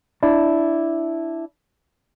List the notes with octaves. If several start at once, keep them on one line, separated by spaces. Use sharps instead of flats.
D4 E4